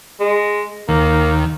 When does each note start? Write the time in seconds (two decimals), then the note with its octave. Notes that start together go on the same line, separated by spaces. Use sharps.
0.20 G#3
0.89 D#2 A#3